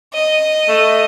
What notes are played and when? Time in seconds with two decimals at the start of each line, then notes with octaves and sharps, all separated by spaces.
0.13 D#5
0.69 A3